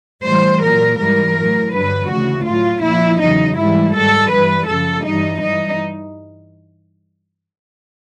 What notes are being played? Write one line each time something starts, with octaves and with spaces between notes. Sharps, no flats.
A2 E3 G3 C5
A#2 F#3 A#4
G#2 E3 G3 A#4
A2 F#3
G2 D3 F#3 B4
D2 C#3 E3 F#4
A2 F#3 F4
A#2 F3 E4
E2 C#3 F#3 D#4
G#2 E3 G3 E4
G#2 D#3 G3 A4
G2 E3 G3 B4
F#2 C#3 F3 A4
G2 E3 G3 D#4
G2 E3 G3 D#4